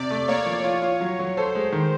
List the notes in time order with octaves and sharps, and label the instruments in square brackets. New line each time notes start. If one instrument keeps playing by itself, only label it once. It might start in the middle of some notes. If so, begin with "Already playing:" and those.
Already playing: [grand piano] C3 [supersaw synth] D5
[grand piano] A3
[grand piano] A#3 [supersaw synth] C#5
[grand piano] F3
F4
F4
F#3
F#3
[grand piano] A4 [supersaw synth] C5
[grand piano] G#3
D#3